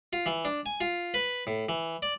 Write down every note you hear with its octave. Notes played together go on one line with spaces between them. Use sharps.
F4
E3
D4
G#5
F4
B4
A2
E3
D5